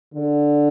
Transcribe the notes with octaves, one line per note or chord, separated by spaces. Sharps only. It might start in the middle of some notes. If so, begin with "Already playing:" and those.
D3